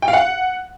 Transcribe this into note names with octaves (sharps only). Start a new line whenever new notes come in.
G5
F5
F#5